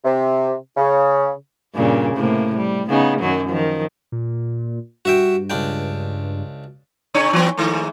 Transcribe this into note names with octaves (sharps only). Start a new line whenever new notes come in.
C3
C#3
G2 A#2 C#3
A2 C3 A#3
G3
C#3 B3 D#4
F#2 D#3 F#3
D#3 F3
A#2
G2 F#4 E5 G5
C#2 D4 G5
C3 D4 C#5
E3 B3
G#2 D#3 A3